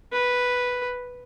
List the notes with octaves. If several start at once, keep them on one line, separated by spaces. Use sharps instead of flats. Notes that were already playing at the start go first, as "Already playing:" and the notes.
B4